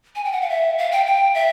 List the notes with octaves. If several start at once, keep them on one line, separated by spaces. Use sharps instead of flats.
G#5
G5
F#5
F5
E5
F5
G5
G5
E5